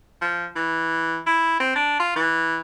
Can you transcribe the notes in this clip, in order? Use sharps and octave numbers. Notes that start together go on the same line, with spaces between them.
F3
E3
E4
C4
D4
F4
E3